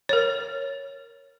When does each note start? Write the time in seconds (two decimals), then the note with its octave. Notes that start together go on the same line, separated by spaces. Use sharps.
0.09 A#4 C#5